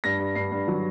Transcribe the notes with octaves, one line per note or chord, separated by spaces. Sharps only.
G2 A#6
G2
G2 C7
G2
F#3